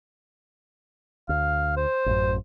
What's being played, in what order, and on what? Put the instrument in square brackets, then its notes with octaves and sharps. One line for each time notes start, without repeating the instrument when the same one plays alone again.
[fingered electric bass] D2 [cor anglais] F5
[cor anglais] C5
[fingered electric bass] A1 F#2